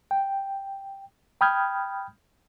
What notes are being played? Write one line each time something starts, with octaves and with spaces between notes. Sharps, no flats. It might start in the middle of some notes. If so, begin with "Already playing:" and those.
G5
G5 B5 D#6 F6 G6 G#6